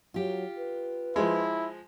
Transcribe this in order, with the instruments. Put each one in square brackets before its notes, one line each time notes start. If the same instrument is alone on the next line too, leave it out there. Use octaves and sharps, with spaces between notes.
[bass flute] F#3 [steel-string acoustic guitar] F4 G4
[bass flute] B4
[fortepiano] F3 G#3 [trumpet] E4